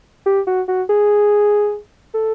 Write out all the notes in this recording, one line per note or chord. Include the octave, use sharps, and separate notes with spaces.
G4
F#4
F#4
G#4
A4